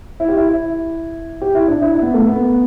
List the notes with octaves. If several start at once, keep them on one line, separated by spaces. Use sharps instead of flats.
E4
G4
E4
G4
E4
D4
E4
B3
A3
B3